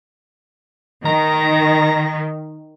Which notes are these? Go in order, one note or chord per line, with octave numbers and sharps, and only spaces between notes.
D#3 A#5